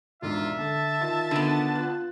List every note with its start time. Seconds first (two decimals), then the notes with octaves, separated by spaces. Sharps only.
0.22 E1 G#2 D4 F4 E5
0.59 D3 A5
1.01 D#3 F4 A6
1.31 D3 B3
1.75 F4 F#6